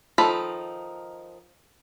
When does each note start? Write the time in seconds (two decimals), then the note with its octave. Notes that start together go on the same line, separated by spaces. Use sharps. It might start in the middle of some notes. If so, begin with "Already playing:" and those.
0.18 D#3 F3 D#4 A4 B5